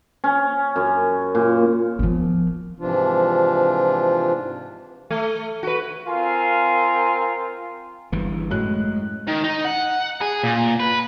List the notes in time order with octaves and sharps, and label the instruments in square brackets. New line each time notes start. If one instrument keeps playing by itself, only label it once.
[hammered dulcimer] C#4
F#2
A#2
[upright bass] F3 B3
[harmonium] G#2 C3 E3 F3 D4 F4
[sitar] A3
F#4 B4
[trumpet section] C4 F4 A#4 F5 G#5 C6
[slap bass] G1 G2 E3
[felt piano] F#2 A2 F#6 [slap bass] G#3
[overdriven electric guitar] D#3
D#4
F#5
G#4
A#2
B4